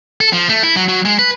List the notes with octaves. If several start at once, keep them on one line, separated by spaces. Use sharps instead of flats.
A4
F3
A3
E4
F#3
F#3
G#3
B4